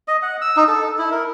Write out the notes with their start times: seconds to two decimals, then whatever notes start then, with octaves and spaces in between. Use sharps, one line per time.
0.08 D#5
0.22 F#5
0.42 E6
0.57 D#4
0.68 A4
0.99 E4
1.12 A#4